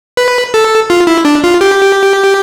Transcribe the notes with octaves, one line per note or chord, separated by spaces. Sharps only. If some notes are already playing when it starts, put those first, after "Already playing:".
B4
A4
F4
E4
D4
F4
G4